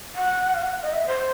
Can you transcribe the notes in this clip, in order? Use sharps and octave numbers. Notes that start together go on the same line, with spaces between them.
F#5
F5
F#5
D#5
E5
C5